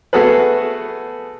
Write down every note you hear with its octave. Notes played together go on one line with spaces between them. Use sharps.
A3 B3 F#4 G#4 A4 B4